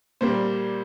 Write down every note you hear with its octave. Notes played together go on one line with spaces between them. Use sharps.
A#2 G3 A#3 C5